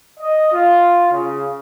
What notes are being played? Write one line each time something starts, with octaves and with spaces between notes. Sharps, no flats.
D#5
F4
C#3